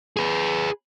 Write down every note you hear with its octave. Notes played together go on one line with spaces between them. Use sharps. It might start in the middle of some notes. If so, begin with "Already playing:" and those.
G#4 B4